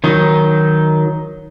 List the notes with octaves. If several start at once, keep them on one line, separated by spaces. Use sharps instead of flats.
D#3 F#3 D#4